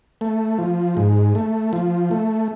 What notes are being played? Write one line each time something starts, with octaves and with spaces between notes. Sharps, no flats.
A3
F3
G#2
A3
F3
A3